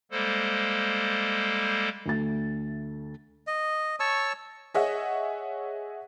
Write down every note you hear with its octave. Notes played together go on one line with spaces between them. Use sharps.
G3 G#3 A#3 A4 C5
D2 A3 A6
D#5
C#5 A5 C#6 E6
G#4 C#5 D#5 E5 F#5